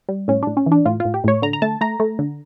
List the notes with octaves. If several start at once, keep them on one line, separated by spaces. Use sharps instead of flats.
G3
A2 C#4
A2 D4
C#4
E3
D4
A2 F4
A2 F4
G4
A2 C#5
D3 A#5
A#5
A3 A5
A3 A#5
A3
D3